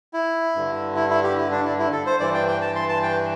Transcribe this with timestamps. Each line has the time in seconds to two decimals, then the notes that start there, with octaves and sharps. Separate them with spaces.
0.13 E4
0.55 G2 D3
0.96 E4
1.10 E4
1.23 G4
1.37 E4
1.51 D4
1.65 E4
1.79 E4
1.93 A4
2.06 C5
2.20 G2 E3 D5
2.34 G5
2.48 G5
2.61 A5
2.75 C6
2.89 A5
3.03 G5